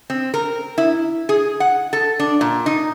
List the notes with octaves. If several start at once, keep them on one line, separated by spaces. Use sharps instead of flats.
C4
A#4
E4
G#4
F#5
A4
D4
A#2
D#4